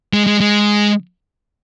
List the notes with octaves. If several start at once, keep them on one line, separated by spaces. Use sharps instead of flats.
G#3
G#3
G#3